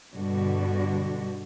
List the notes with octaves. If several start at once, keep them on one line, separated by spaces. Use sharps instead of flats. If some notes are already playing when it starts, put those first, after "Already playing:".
G2 B2 D3 G3 F#4